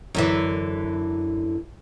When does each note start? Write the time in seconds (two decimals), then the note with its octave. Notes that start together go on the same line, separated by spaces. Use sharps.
0.15 F#2 D3 E3